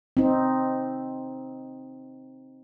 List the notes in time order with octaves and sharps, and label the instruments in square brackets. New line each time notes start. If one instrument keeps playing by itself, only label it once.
[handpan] C4 D#4